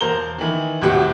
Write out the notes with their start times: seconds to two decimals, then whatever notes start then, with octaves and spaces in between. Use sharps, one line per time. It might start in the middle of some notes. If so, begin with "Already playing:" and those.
0.01 E1 A#4 C5 A#5 G7
0.38 D#3 E3
0.81 D#1 C2 A2 F#4 G4